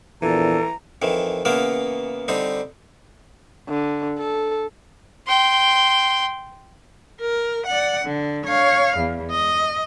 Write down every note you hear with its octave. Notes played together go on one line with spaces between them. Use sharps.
A#1 E2 A#2 E3 A4 A#5
F2 D#3 E3
C#3 E3 A#3 B3 A#4
D3 G3 C4 D#4
D3
A4
G5 C6
A#4
D5 F#5
D3
C#5 F5
E2
D#5